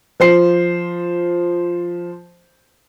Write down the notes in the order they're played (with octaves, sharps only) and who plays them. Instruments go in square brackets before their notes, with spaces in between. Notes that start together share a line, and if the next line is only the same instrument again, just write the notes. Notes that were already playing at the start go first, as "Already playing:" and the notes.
[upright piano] F3 C5 C7